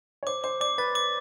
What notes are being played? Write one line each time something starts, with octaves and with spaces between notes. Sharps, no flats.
C#5
C5 D6
C5 D6
D5 D6
B4 A6
D6